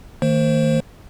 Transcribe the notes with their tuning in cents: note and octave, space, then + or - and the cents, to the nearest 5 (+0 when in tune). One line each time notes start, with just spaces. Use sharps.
D#3 +5 A3 +45 C5 +5